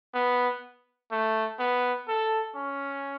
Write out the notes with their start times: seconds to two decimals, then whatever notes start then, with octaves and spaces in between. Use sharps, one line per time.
0.15 B3
1.12 A3
1.59 B3
2.08 A4
2.55 C#4